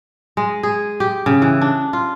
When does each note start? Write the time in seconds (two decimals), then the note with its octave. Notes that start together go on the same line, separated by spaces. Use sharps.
0.37 G#3
0.63 G#4
1.00 G4
1.26 C#3
1.42 E3
1.61 D4
1.93 F4